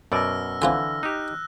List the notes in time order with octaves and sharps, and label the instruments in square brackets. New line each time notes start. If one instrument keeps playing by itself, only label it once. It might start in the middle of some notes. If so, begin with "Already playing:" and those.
[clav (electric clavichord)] F#2 B2 D5 [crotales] E6 F6 A#6
[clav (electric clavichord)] D3 E3 [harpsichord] C4 F4 G#5
[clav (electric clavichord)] D#4 G4 [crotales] F#6